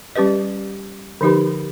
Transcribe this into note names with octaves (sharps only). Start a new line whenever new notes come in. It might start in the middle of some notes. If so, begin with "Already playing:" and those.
G3 C#4 G4 B4 D#5
D3 F3 D#4 G4 B4